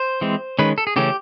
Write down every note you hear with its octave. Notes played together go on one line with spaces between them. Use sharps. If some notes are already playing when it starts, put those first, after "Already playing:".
Already playing: C5
E3 G#3 C4
D#3 G#3 C#4 B4
A4
G#4
C#3 E3 A3 C#4 G4